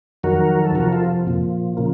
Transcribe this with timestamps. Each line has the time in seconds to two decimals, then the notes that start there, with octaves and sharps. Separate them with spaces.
0.23 F2 D#3 F#3 F#4 A#4
0.64 A4
0.75 F2 C3 F3 F#4 A#4
0.93 F4 A4
1.27 A#2 F3
1.77 C#3 F3 A#3